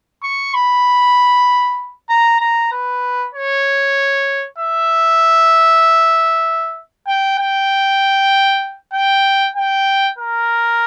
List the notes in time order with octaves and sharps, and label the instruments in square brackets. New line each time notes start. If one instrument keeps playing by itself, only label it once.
[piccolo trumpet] C#6
B5
A#5
A#5
B4
C#5
E5
G5
G5
G5
G5
A#4